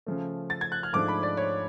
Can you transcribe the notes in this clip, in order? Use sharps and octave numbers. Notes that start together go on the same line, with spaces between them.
C#3 F3 A3
A6
G#6
F#6
F6
G#2 F3 A3 D4 D6
B5
D5
C#5